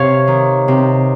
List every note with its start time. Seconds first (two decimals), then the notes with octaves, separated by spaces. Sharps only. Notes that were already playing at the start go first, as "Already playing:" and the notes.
Already playing: C3 C#5 F5
0.28 D#3
0.68 C3